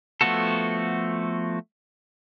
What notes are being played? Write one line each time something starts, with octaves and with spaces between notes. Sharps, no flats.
F3 A3 B3 F#4 A4